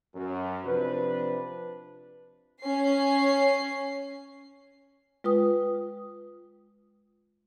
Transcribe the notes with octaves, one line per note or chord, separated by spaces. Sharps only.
F#2
C3 F3 D4 B4
C#4 C7
G#3 F4 B4 G5 D#6